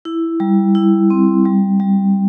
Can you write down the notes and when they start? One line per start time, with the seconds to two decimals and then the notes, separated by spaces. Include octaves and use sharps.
0.05 E4
0.40 G3
0.75 E4
1.10 C4
1.45 G3
1.80 G3